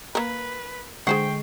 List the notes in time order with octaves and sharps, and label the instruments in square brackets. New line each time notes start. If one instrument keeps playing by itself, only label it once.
[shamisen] A#3 A#4 [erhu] B4
[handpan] D3 G#3 [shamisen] G#4 C5 F#5 [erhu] G5 [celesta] C#6 C7